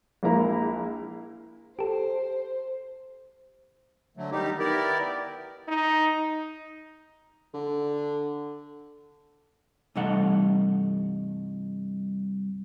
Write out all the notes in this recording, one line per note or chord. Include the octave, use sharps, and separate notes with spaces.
A#1 G#3 A#3 E4 A#5
G4 A4 C5
D3 F#3 A3
D#3 G3 D#4 G4
B3 E4 G4 A#4 D5
D#4
D3
C2 G2 E3 A3 D#4 F#5